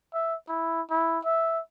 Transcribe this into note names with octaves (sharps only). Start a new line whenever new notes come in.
E5
E4
E4
E5